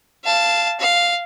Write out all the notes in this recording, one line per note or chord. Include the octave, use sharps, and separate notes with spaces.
F5 A5
F5